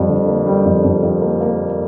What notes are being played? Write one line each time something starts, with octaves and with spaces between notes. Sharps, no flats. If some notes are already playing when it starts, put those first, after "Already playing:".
Already playing: F2 G3
D3
A#3
G3
F2
F2
F2
A#3
A#3